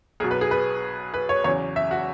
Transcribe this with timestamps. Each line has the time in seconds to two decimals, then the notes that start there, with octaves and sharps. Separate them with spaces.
0.20 B1 G#4
0.23 B2 F#3
0.31 B4
0.41 G#4
0.51 B4
1.14 B4
1.29 C#5
1.44 E2 C#3 F#3 C#5
1.76 E5
1.91 F#4